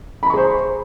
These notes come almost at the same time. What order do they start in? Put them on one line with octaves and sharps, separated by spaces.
B5 A#5 C#6 G#4 C5